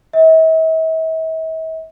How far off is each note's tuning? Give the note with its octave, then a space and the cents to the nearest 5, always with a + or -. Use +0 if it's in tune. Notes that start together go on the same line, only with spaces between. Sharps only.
E5 -45